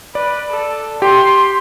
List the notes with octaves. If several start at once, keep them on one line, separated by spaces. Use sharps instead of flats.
B4 D5
A4
G4 C6